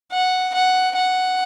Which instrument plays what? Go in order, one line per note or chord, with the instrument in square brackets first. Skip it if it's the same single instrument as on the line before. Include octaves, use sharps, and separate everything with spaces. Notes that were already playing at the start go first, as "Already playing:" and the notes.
[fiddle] F#5
F#5
F#5